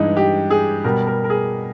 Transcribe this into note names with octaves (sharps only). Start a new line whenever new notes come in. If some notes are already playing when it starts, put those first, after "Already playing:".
Already playing: G2 E3 G#3 D#4
G4
G#4
B2 G3 A#4
A#4
A#4
G#4